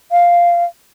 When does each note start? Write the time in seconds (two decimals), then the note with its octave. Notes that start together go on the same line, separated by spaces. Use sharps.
0.12 F5